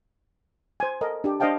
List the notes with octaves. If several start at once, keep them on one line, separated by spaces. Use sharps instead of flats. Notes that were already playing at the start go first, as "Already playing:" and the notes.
C5 G#5
A4 A#4 D#5
D4 G4
D4 C5 D#5 F5 G5 A5